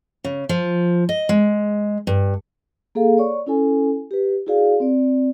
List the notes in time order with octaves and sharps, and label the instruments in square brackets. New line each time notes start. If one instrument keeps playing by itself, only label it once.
[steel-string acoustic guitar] C#3
F3
D#5
G#3
G2
[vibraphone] A#3 G#4 A4 F5
C#5 D5 C#6
C#4 E4 A4 G#5
G4 B4
E4 F#4 G#4 D5 F5
C4 D5